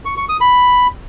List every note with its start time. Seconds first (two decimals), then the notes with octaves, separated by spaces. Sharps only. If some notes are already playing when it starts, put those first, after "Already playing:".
0.05 C#6
0.17 C#6
0.29 D#6
0.41 B5